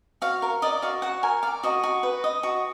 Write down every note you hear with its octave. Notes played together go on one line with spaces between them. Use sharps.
F#4 F5
A#4
D5 D#5
F#4 F5
F#4 F#5
A#4 G#5
D5 F5
F#4 D#5
F#4
B4
D#5
F#4